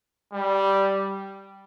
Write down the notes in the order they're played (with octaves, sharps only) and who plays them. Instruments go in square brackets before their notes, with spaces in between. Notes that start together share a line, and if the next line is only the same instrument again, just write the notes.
[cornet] G3